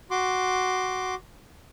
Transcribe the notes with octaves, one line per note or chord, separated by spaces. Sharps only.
F#4 C6 D6